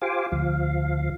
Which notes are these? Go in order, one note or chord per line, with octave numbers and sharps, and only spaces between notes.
F4 G4 C5 F5 G#5 D6
D2 F3 F5